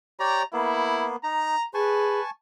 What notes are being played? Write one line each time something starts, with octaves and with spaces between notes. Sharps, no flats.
G4 C#5 D5 A#5
A#3 B3 E4
D#4 A#5
G#4 B4 G#5 A5 C#6